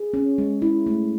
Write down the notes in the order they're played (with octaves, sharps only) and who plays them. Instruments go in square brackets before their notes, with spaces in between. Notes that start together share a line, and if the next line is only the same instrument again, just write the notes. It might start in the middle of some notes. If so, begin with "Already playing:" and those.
Already playing: [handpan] G#4
C#4
G#3
E4
A3